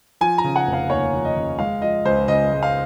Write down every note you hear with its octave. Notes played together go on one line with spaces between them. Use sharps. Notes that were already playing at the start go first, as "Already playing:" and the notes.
F3 G#5
A#5
C#3
F#5
F1
F5
D#2 C#5
F3
D#5
C#3
G#3 F5
F3 D#5
C#2 C5
C#3 D#5
G#3
F5